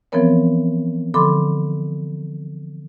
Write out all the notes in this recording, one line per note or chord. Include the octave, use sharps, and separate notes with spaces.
E3 F3 B3 C4 A#4 C#5
D3 F3 A4 B5 C6 D6